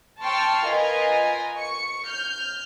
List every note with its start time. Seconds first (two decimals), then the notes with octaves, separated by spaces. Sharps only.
0.22 G5 A5 C6 C#6 E6 F6
0.65 F4 A#4 B4 D#5 G#5
1.58 C#6 C#7
2.07 F6 G6